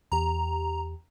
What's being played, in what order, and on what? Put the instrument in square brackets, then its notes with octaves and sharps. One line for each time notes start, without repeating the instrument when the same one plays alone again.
[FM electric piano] E2 G4 [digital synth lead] A#5